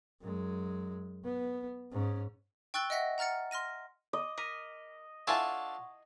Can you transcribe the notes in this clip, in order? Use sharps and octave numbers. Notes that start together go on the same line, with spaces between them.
F#2 G#3
B3
G#2 C#4
G5 C#6 E6 F#6 A6 G7
D#5 E5 F#5 A#6 B6
F#5 A#5 F6 A6 C#7
C6 F6 A#6 D#7
D#5 D6
A#4 D6 B6 D#7
D4 E4 F4 A4 F#5 G#5 A5 C#6